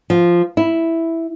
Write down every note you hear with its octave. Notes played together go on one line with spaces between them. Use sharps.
F3
E4